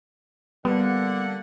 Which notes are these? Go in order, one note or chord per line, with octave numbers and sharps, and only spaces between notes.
D3 G3 A#3 B3 F#5